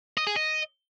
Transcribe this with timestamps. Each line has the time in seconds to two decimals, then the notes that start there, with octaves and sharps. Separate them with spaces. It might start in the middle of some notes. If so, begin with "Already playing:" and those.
0.17 D#5
0.27 G#4
0.36 D#5